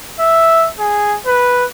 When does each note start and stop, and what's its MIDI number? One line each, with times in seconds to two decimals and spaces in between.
0.19 0.67 76
0.79 1.16 68
1.27 1.65 71